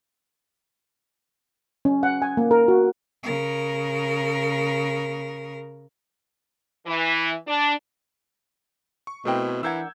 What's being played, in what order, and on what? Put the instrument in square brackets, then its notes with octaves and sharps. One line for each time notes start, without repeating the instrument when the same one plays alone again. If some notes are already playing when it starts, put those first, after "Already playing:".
[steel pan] C#4
F#5
G#5
A#3
A#4
F#4
[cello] C#3 A#4
[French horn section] E3
D4
[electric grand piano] C#6
[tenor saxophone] B2 [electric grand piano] A3 C4 E4 [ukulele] A#4 G5
[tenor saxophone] E3 [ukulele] D4 A#4 F#5 [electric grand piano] E6 G6 G#6